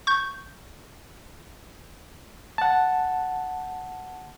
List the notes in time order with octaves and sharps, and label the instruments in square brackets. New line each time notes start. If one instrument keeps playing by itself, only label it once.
[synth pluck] C#6 G6
[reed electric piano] F#5 A5